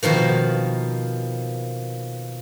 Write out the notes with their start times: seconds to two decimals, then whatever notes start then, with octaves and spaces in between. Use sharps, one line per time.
0.03 B2 D#3 F3 A#3